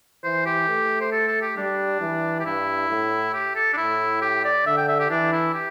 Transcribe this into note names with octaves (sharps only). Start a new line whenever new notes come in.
E3 C5
G4
A3
C5
A4
A4
G4
G3 D4
E3
G4
G2 E4
A2
G4
A4
D4
A2 E4
G4
D5
D3 E5
G5
E5
G4
E3 D4
E4
G4